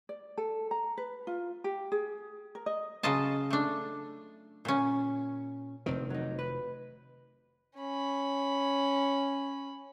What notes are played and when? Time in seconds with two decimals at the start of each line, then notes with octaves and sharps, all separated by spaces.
0.09 D5
0.37 A4
0.71 A#5
0.97 B4
1.27 F4
1.64 G4
1.92 G#4
2.55 A#4
2.66 D#5
3.03 C#3 F#3 F4 D#5 A5
3.50 A3 D4
4.65 A#2 C#4
5.86 F1 D#3 C4
6.10 F#3 D#4
6.39 B4
7.78 C#4 B5